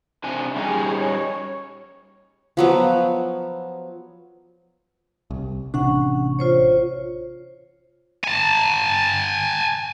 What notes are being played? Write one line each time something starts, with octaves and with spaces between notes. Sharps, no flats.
C3 D4 G#5
G3 C#4 D#4 G#4
C#5
F3 F#3 B3
C2
A1 C3 C#4 D4 F#5 C#6
F4 C5 C#5
G#5 A5